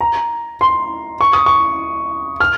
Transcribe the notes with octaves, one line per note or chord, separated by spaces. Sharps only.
A#5
C6
C#6
D#6
C#6
F6